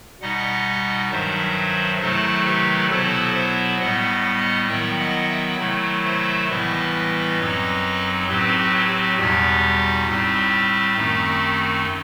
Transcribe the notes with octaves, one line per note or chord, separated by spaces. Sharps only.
B2 G3 D#4 D#5 F#5
G2 D#3 F#3 C5 E5
C3 D#3 F#3 A3 E4 A4 C5
G4 B4
B2 F#3 B3 E4 A4 C5
C5 E5
A2 G3 B3 D#5 F#5
D#3 F#3 B3 E4 E5 G5
D#5 F#5
E5 G5
C3 D#3 F#3 A3 E4
C5 E5
A2 E3 G3 B3 E4 B4 D#5
F#2 F#3 C4 D#4
A2 F#3 C4 G4 B4
G4 B4
G4
E2 B2 G3 D#4 G4
A2 G3 C4
F#2 D#3 A3 C4 D#4